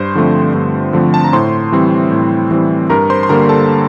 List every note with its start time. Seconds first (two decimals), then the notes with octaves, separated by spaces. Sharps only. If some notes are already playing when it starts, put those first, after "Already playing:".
Already playing: G2 C5 C6
0.15 D3 F3 A3 C4
0.54 G2
0.93 D3 F3 A3 C4
1.14 A5
1.24 A#5
1.33 A2 C5 C6
1.72 E3 G3 C4
2.11 A2
2.51 E3 G3 C4
2.90 G2 A#4 A#5
3.10 C5 C6
3.23 C6
3.29 D3 G3 A#3 A#4 A#5
3.49 A4 A5